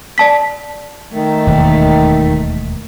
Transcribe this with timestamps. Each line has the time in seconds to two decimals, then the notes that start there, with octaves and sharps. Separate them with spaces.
0.18 D5 A5 B6
1.13 D#3 A3
1.47 E1 D#2